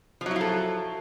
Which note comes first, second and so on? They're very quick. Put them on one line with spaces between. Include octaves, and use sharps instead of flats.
F3 F#3 E4 F4 A4